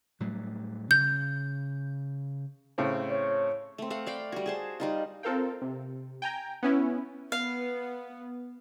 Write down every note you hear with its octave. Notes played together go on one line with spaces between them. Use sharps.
A2 F#3 G3
C#3 G6
A2 C#3 C4
C#5
A3 C4
A3 F5 F#5
D5 F5 G5 B5
G3 F#4
G#4 C5 A5
G3 D#4 F4
C4 F4 A4 A#4 F5 G5
C3
G5 G#5 A#5 G6
B3 C#4 E4
B3 F5